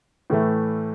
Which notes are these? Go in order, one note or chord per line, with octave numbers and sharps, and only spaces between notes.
A2 E3 A3